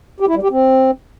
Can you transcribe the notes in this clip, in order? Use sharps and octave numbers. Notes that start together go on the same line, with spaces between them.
G4
E4
G3
G4
C4